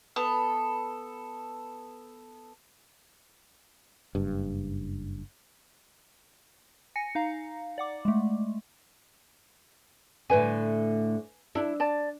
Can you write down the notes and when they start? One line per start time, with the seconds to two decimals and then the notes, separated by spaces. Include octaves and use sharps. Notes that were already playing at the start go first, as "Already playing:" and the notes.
0.16 B3 A4
4.15 F#1 G2
6.96 G#5 A#6 C#7
7.15 D#4 F5 A#5
7.78 D5 F#5 D6
8.05 G#3 A3
10.30 A2 D3 B4 G#5
11.55 D4 E4
11.80 D5 A5